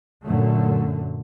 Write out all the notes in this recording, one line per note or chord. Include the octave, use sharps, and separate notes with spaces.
F#2 A#2 D3 A3